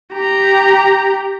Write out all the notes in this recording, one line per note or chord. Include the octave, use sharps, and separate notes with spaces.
G4 A#5